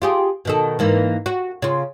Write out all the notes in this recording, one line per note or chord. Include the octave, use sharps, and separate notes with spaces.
F4 G4 G#4
B2 D#3 A4
G#2 E3 A#3
F#4
C#3 F4